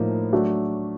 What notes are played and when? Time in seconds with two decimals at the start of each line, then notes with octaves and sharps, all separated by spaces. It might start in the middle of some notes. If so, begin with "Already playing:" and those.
Already playing: A2 F3 A#3 D#4
0.33 F#3 A3 D4 F#4